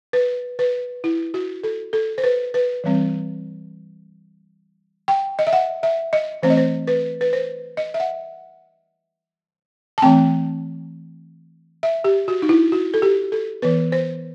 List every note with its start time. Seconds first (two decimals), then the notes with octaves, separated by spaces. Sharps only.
0.13 B4
0.59 B4
1.04 E4
1.34 F#4
1.63 A4
1.93 A4
2.18 C5
2.24 B4
2.54 B4
2.84 E3 G3 C4
5.08 G5
5.39 D#5
5.47 E5
5.53 F#5
5.83 E5
6.13 D#5
6.43 E3 A3 C4 C5
6.50 D#5
6.57 C5
6.87 B4
7.21 B4
7.33 C5
7.77 D#5
7.94 E5
8.00 F#5
9.98 A5
10.02 E3 A3 C4 G5
11.83 E5
12.04 G4
12.28 F#4
12.42 D#4
12.49 E4
12.72 F#4
12.94 A4
13.02 G4
13.32 A4
13.62 E3 B3 B4
13.92 C5